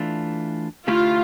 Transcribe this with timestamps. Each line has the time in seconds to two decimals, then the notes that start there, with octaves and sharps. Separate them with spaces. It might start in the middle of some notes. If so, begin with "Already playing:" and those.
Already playing: E3 A3 D4 F4
0.87 D3 A3 E4 F4 G4